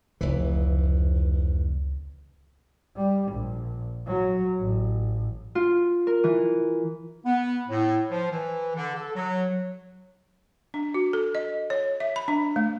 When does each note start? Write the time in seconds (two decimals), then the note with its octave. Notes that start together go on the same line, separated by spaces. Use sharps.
0.21 F1 C#2 E3
2.96 G3
3.32 A#1
4.06 F#3
4.60 A1
5.55 F4
6.07 A#4
6.24 E3
7.26 B3
7.68 A2
8.10 F3
8.31 E3
8.76 D3
8.96 A4
9.16 F#3
10.74 D4
10.94 F#4
11.13 A4
11.35 D#5
11.70 C#5
12.00 E5
12.16 B5
12.28 D4
12.56 A3